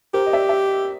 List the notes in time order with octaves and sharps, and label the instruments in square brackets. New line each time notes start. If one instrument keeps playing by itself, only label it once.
[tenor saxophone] G4 [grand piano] A#4 C5
[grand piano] D#5
D5 E5
E5